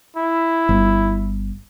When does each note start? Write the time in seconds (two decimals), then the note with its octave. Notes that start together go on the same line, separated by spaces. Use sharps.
0.17 E4
0.69 G1